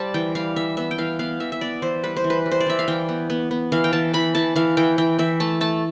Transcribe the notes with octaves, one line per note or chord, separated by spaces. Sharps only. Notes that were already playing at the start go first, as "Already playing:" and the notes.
Already playing: G3 C5 D5 A5
E3 G5
G3 F5
E3 E5
B3 E5
G5
E3 F5
B3 F5
E3 E5
E5
B3 D5
E3 C5
G3 B4
C5
E3
B4
G3
C5
D5
E3 E5
F5
E3 G5
B3
B3
B3
E3 F5
G5
E3 A5
E3 B5
E3 A5
E3 F5
E3 G5
E3 G5
E3 E5
A3 A5
A3 A5